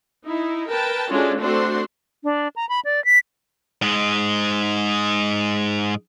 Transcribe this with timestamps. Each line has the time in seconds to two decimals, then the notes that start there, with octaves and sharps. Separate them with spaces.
0.24 D#4 E4
0.69 A#4 B4 G5 A5
1.10 G#3 C#4 D4 F4 F#4 A4
1.39 A3 C4 D4 F#4 C5 C6
2.24 D4
2.56 A#5
2.69 B5
2.85 D5
3.05 B6
3.82 G#2 G#3